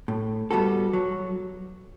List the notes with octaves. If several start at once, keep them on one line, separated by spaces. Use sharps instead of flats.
A2
G3 B3 F#4 A4
F#3